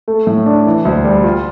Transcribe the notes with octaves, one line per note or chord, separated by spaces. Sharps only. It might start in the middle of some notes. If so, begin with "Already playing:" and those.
A3
A2
D4
E3
D2
G3
F4